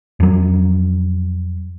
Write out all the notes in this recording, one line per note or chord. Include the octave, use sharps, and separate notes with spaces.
F2 F#3